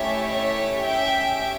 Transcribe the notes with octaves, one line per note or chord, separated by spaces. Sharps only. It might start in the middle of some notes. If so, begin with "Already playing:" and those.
Already playing: A3 C#4 E4 G4 C#5 E5
C#5 E5
C#4 G4 E5 G5